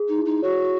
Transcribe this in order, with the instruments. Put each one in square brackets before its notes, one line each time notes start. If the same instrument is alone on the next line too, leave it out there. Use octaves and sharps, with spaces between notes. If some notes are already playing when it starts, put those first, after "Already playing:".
Already playing: [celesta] G#4
[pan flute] D#4
[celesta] E4
[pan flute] D#4
[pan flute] F#4 [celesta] C#5